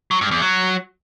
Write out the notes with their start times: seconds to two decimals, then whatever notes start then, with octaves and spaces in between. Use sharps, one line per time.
0.11 F#3
0.21 G2
0.31 E2
0.42 F#3